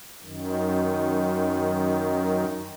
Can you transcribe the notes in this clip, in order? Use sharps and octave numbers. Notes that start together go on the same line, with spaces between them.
F#2 D#3